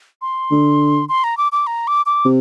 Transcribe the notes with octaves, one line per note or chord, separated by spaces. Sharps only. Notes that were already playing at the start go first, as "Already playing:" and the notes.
C6
D3
C6
A#5
D6
D6
A#5
D6
D6
C3